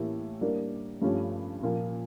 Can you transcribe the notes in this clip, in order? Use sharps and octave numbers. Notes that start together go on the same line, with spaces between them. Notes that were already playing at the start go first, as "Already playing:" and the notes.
Already playing: A2 E3 A#3 E4 G4
G3 A#3 D4 G4 A#4
G2 F3 A3 C#4 G4
A#2 F3 A#3